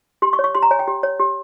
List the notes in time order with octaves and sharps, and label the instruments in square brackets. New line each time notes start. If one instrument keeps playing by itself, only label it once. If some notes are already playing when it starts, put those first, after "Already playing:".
[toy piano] G4 C6
C#6
C#5
C#6
G4 C6
A#5
C#5 G#5
G5
G4
C#5
G4